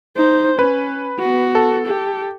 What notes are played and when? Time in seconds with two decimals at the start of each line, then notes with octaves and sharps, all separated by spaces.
0.17 D#4 C5
0.59 C#4 B4
1.20 B3 F#4
1.55 A4
1.86 G4